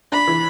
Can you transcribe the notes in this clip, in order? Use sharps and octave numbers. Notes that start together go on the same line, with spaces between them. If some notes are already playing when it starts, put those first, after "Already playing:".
D4 B5
E3